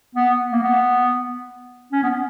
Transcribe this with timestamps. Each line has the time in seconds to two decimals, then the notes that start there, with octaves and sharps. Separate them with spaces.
0.15 B3
0.52 A#3
0.63 B3
1.93 C#4
2.03 B3